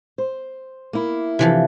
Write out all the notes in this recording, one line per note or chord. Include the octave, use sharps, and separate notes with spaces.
C5
A#3 E4
C3 E3 F3